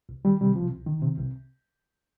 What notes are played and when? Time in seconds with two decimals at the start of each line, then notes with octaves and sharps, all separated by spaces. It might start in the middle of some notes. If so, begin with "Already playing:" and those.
0.09 C2
0.25 D#3 G3
0.41 C3 G3
0.55 C2 F3
0.72 C2
0.86 D#3
1.02 C3
1.18 C2